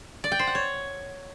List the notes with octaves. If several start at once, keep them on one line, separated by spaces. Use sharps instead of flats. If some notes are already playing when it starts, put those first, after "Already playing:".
D5
G5
C5
F#5
C#5